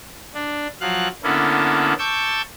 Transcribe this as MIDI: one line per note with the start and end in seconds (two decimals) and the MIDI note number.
0.34 0.67 62
0.81 1.08 53
0.81 1.08 54
0.81 1.08 77
0.81 1.08 90
1.23 1.94 50
1.23 1.94 58
1.23 1.94 59
1.23 1.94 61
1.23 1.94 64
1.23 1.94 69
1.99 2.42 81
1.99 2.42 85
1.99 2.42 86
1.99 2.42 88
1.99 2.42 91